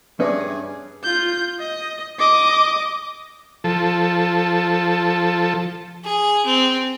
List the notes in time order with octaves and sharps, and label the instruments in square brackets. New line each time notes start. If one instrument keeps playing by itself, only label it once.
[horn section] G2 G#4 [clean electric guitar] C#4 [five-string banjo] B4 [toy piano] D5 E5 D6
[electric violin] F4 G6
D#5
D#5 D6
[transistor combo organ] F3 A4
[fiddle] G#4
C4